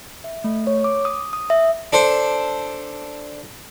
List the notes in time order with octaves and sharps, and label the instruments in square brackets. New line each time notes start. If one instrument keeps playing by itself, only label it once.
[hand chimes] E5
A3
C#5
D6
D#6
D#6
E5
[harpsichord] D4 A4 C5